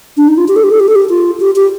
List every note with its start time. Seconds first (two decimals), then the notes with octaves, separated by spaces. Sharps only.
0.17 D4
0.28 D#4
0.37 F4
0.48 G4
0.56 A4
0.63 G4
0.71 A4
0.80 G4
0.88 A4
0.95 G4
1.09 F4
1.40 G4
1.56 G4